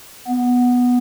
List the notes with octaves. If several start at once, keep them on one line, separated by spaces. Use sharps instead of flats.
B3